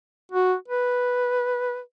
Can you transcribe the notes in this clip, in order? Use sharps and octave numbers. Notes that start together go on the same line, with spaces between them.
F#4
B4